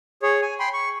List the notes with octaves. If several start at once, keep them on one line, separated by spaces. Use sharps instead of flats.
G#4 C#5
G#5
G5 B5 C6
C#6